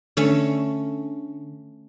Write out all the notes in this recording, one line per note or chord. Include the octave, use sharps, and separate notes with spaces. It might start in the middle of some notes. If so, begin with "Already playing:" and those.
D3 A3 C#4